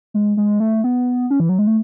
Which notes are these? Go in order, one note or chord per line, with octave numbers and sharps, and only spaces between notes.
G#3
G#3
A3
B3
C#4
E3
F#3
G#3
A3